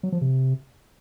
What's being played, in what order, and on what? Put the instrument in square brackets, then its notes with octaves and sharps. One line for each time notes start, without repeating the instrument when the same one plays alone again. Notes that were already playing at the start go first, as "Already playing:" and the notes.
[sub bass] F#3
F3
C3